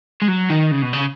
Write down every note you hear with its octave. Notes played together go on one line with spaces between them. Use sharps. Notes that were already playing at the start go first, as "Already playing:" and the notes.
G#3
F#3
D#3
C#3
B2
C#3